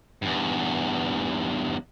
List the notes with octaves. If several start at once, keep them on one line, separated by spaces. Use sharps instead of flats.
E2 G2